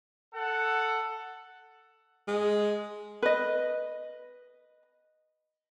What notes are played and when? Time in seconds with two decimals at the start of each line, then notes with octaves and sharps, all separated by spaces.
0.34 A4 F#5
2.28 G#3
3.22 B4 D#5